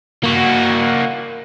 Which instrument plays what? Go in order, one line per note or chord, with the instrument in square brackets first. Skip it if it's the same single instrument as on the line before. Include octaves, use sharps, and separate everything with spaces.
[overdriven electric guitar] A#3 F#4